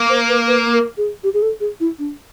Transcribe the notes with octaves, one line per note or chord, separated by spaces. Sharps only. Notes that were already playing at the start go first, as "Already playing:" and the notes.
Already playing: A#3
C5
B4
B4
A#4
G#4
G4
G#4
A4
G#4
E4
D4